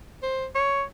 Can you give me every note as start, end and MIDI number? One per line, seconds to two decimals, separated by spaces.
0.23 0.46 72
0.55 0.83 73